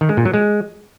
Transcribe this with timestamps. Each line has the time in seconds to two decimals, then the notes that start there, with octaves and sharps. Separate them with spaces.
0.01 D#3
0.09 G#3
0.17 A#2
0.25 F#3
0.34 G#3